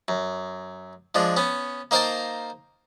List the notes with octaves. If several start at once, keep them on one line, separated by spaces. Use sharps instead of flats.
F#2
F3 G#3 D4
B3 C#4
A#3 D#4 C5 F5 G5 A5